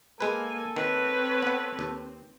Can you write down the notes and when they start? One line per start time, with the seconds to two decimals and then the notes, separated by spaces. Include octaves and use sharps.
0.20 G#3 A#3 A4 B4 G#5
0.76 D#3 C4 B4 C#5
1.43 B3 F#5
1.79 D#2